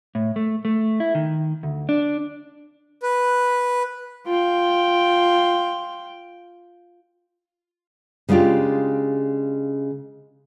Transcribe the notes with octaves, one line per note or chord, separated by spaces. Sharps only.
A2
A3
A3
E4
D#3
D2
D4
B4
F4 G5
C#3 G#3 D4 F4 G4